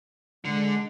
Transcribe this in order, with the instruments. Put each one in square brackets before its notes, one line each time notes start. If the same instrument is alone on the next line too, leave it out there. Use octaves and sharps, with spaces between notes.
[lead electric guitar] D3 [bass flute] G#3